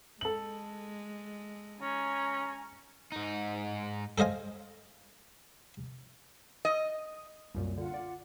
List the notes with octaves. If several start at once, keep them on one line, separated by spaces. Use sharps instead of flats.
G#3 A4 F#7
C#4 G#5 A#5
G#2 D#4
A4 C5 D#5 F5 G#5
D#5
C2 F#2 A#2
D3 F4 F#5
D5